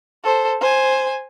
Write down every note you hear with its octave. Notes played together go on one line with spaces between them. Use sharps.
A4 C5
C5 G#5